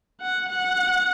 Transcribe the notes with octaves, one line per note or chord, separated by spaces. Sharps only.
F#5
F#5